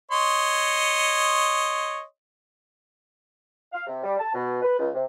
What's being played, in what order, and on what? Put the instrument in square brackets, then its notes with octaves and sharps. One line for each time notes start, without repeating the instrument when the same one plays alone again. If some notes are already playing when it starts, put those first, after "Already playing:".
[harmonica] C#5 D#5 C6
[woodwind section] F5
C3
G3
A5
B2
B4
C#2
C3